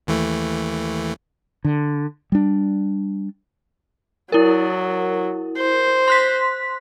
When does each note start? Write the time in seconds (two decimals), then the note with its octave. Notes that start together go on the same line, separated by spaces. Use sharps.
0.07 D#2 E3 A3
1.65 D3
2.32 G3 D4
4.32 F#3 E4 A#4
5.58 C5
6.08 C6 F#6 B6